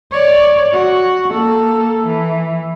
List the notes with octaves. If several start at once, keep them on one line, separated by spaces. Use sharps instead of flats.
C#5 D5
F#4
A#3 A4
E3